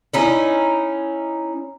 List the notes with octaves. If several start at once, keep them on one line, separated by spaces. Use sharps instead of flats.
C#4 D#4 E4